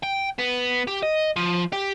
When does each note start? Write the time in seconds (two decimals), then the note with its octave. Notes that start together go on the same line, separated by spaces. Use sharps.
0.03 G5
0.39 B3
0.88 G4
1.03 D#5
1.37 F3
1.73 G4